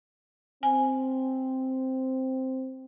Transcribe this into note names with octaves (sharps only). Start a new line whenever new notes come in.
C4 G#5